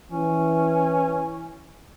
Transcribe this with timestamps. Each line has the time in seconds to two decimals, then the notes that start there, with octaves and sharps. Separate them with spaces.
0.12 E3 C#4